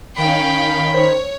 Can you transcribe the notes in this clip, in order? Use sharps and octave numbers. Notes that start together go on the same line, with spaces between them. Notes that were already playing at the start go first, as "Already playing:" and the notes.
D#3 C#4 F5 G5 B5
C5 C#5